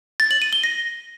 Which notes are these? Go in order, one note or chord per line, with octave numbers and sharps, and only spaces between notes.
A6
F#7
D#7
G7
A#6